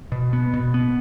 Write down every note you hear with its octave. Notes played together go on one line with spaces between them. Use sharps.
B2
B3
B2
B3